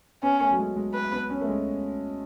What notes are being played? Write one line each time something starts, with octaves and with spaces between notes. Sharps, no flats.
B3 C#4
A3
F#3
G#3
G#3
B4
B3
C#4
A3
G#3